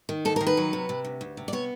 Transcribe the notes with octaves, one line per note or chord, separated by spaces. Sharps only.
D#3
D2 A4
A#4
D#3
B4
F#3
C3
C3
D2
D2
C3
D5
B3 C#5